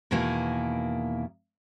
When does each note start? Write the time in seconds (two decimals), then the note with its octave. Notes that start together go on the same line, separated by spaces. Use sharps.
0.11 E2 B2 D#3 A#3 E4 G#5